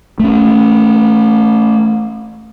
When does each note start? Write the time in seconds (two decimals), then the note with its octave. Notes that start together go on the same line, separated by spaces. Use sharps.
0.20 A3 C#4